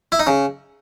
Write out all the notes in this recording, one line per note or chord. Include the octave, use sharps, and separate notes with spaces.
E4
D#4
C#3